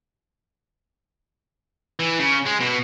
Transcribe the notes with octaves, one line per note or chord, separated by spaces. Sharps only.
E3
C#3
G#3
B2